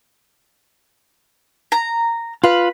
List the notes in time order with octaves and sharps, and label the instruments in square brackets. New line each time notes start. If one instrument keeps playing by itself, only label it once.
[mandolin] A#5
[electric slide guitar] F4 F5 [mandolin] B4